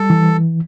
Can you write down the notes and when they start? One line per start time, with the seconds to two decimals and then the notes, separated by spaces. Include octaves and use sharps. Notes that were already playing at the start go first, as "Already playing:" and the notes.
Already playing: G3 A4
0.10 E3